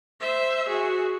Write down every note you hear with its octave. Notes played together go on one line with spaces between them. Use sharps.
C5 E5
F#4 G#4